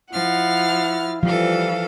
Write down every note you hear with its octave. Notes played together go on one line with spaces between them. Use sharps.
F3 E4 F#5 F6 A6
E3 F3 G3 A4 F5